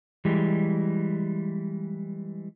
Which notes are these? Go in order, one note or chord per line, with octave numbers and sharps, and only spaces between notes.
E3 G3 G#3